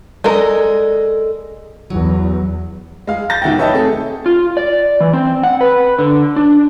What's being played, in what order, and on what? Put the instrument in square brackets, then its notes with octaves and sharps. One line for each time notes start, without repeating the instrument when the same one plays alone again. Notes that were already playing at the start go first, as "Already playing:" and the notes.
[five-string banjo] G#3 A#4 [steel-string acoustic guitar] A4 D5 D#5
[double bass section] E2 [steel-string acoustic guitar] F#3
[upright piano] G#3 F5
G6 A6 A#6
B1 D#3 E5 F#5 G5
B4 C#5 D#5 E5 G5 A5
C3 A3 G#4 A4
[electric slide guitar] F4
D5
E3
C4
F#5
B4
D3
D4